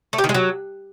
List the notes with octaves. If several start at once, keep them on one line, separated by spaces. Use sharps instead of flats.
A3
G4
D#3
G#3
F#3